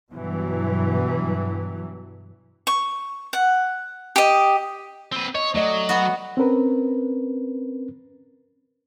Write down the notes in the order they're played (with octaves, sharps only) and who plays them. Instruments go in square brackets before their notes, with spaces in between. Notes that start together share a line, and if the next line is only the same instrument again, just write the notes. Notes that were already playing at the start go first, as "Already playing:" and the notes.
[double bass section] G2 B2 E3 F#3
[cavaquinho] C#6
F#5
G4 D#5
[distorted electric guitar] C4 B4
[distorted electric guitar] C#5 [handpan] D#5
[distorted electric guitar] F#3 [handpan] A3 D5 D#5
[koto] B3 F#4
[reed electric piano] C4 C#4 A#4 B4